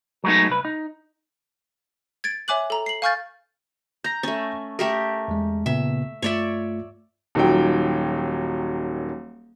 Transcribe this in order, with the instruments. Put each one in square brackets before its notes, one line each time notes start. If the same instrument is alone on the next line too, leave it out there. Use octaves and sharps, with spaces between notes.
[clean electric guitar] F#3 G#3 A3 B3 D#4
C2 B4
D#4
[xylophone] G#6 A6 D7
C#5 E5 G#5 D6 F#6 F#7
A4 A#5
C7 F#7
F5 G#5 C#6 F6 G6 A6
[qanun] A#5 [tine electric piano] G6 A#6
[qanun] A3 C#4
[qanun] A3 G4 A#4 [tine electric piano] A4
[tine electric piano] E2 G#3
[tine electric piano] A#2 C#3 B3 [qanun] E5
[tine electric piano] G2 A3 F4 [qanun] C#5 D5 E5
[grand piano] D#1 D#3 F#3 G5